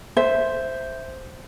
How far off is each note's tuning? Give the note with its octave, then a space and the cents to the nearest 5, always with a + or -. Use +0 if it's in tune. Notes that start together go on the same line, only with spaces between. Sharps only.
C5 +0 E5 +0